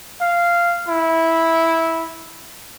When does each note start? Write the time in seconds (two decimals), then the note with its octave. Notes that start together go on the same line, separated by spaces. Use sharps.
0.21 F5
0.88 E4